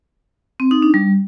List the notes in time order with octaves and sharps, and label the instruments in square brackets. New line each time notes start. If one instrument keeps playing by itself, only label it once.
[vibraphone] C4
D#4
D4
G3